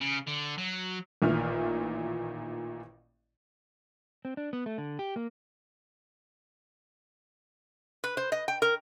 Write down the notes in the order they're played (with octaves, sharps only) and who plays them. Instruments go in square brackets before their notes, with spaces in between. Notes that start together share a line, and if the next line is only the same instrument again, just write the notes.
[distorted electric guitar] C#3
D3
F#3
[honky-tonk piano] A1 A#2 D#3 E4 F6
[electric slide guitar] C4
D4
B3
A3
D3
G4
A#3
[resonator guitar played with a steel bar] B4
C5
D#5
G5
A#4